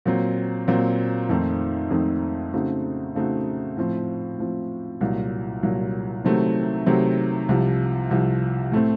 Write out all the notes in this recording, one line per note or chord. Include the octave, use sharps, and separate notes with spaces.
A#2 F#3 C4
A#2 F#3 C4
F2 D#3 A3 C4 D#4
F2 D#3 A3 C4 D#4
C#3 A3 C4 D#4 F#4
C#3 A3 C4 D#4 F#4
A2 F3 C4
A2 F3 C4
C2 A#2 F#3
C2 A#2 F#3
C3 D#3 F#3 A3 C4
C3 D#3 F#3 A3 C4
C2 C3 F3
C2 C3 F3
A2 A3 C4